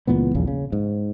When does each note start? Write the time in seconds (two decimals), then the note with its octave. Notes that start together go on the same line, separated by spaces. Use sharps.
0.07 C#2 A#2 E3 B3
0.35 D#1 A#1 E2 C#3
0.47 C#3
0.72 G#2